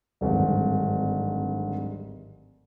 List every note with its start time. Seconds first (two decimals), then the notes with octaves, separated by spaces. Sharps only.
0.21 D1 G#1 G2